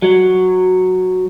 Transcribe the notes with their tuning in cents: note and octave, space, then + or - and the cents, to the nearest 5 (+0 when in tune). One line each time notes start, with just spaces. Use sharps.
F#3 -5